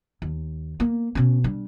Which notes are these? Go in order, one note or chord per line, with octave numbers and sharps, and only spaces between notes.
D#2
A#3
B2 C#4
G3 D4